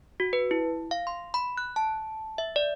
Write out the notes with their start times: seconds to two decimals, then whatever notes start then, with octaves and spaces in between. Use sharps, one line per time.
0.20 F#4
0.33 B4
0.51 E4
0.91 F5
1.07 C6
1.34 B5
1.57 F#6
1.76 A5
2.38 E5
2.56 D5